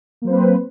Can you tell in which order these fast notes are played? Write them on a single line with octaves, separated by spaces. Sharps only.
A#3 F#3 C5 C4 B4